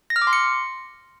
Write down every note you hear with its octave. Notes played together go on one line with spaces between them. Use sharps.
A#6
F6
D6
C6
C#7